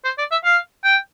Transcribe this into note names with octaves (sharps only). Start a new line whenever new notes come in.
C5
D5
E5
F5
G5